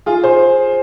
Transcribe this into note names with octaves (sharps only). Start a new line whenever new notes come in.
F4 G#4
G#4 C5